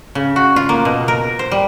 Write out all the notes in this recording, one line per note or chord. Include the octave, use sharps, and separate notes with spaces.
C#3
F#4
F4
A#3
B2
A#4
C5
G3